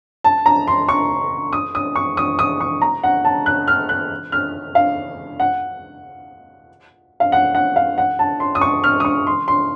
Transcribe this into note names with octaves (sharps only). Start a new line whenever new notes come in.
A5
A#5
C6
C#6
D#6
D#6
C#6
D#6
D#6
C#6
A#5
F#5
A5
F#6
F6
F#6
F6
F5
F#5
F5
F#5
F#5
F5
F#5
A5
C6
D#6
C#6
F6
D#6
C#6
C6
C6